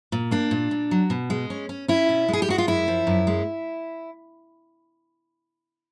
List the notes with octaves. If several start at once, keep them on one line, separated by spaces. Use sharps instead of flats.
A#2
A#3 D4
A#2
A#2
F#3
B2
G#3
C#4
C#4
C#4 E4
B2
G#3 G#4
G4
G#3 F#4
F4
F#2 E4
F3
F#2
G#3